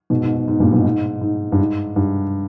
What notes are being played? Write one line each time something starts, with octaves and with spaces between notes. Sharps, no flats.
G#2 B2
G#2
G#2
G#2
G2 A#2
G#2 B2
G#2
G#2
G2
G#2
G2